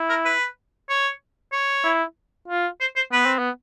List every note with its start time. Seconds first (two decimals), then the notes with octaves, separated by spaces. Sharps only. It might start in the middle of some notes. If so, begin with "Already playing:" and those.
Already playing: E4
0.09 A#4
0.25 B4
0.89 C#5
1.52 C#5
1.84 E4
2.48 F4
2.81 C5
2.96 C5
3.12 B3 B4
3.26 C4
3.39 B3